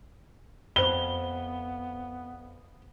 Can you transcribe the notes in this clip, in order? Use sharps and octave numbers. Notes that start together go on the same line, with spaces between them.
F2 B3 C5 B5 G7